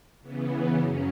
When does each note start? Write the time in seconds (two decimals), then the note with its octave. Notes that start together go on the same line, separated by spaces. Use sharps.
0.22 C#3 E3 B3
0.77 F#2 C#3 F#3 C#4